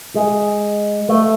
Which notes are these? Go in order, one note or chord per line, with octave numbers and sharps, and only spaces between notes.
G#3
A3